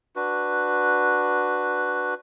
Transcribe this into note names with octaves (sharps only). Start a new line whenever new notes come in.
D4 F#4 B4